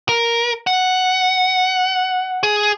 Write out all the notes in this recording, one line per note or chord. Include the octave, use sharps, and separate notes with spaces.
A#4
F#5
G#4